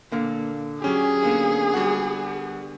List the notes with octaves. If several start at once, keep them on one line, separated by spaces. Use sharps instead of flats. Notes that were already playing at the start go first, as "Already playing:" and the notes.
A#2 D3 A#3
F#3 C#4 G4 G#4
D3 A#3 B3
G3 F#4 F#5